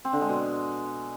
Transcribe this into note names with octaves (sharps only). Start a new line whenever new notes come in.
C4
D3
G#3
B2